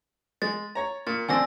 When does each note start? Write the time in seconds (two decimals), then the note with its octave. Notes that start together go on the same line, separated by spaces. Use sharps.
0.42 G#3 A6
0.75 C#5 A#5
1.07 A#2 A6
1.29 D3 C4 D4 G#5 E6 A#6